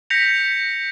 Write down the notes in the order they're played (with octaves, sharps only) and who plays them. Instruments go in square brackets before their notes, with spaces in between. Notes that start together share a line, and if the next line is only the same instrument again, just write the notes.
[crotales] G6 A#6 B6 C#7 F7